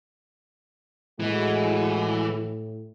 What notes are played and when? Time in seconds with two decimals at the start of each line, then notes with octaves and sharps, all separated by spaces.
1.20 A2 E3 G#3 F#4